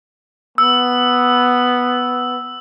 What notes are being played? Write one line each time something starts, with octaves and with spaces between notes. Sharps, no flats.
B3 E6